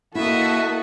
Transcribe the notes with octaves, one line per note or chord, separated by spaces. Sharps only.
A#3 E4 F#4 A4 D#5 E5